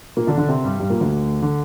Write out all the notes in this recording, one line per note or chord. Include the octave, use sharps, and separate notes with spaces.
A#2 A#3
D3 D4
D3 D4
C3 C4
G2 G3
G2 G3
A#2 A#3
D2 D3
D3